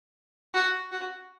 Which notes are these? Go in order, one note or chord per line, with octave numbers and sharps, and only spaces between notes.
F#4
F#4